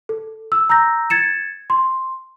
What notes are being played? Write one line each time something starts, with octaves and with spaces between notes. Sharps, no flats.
A4
E6
A#5 E6 G6 A#6
G#6 A6 C#7 E7
C6